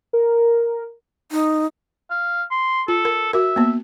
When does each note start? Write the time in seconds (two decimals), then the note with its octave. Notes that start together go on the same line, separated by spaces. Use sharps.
0.13 A#4
1.32 D#4
2.10 F5
2.51 C6
2.88 F4 A4
3.05 A#4
3.33 F#4 A#4 E5
3.56 A#3 B3